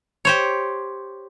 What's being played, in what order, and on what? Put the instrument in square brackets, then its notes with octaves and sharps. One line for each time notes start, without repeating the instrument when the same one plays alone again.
[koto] G4 C5 C#5